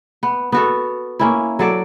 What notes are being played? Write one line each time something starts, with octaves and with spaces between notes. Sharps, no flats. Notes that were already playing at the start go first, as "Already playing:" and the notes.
B3
B3 F#4 A4
A#3 C#4 E4
F#3 A4 D5